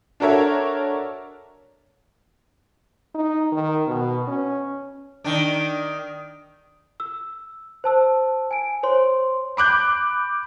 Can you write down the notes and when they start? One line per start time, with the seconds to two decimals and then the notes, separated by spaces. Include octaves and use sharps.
0.20 D4 F#4 A4 A#4 C#5 E5
3.15 D#4
3.52 D#3
3.88 B2
4.27 C#4
5.24 D#3 D4
7.00 E6
7.84 C5 A5 E6
8.51 G#5 D7
8.83 C5 C#5 C6
9.57 B5 D6 F#6 G6